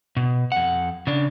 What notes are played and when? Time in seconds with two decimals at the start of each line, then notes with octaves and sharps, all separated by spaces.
0.17 B2
0.52 F2 F#5
1.07 C#3 D4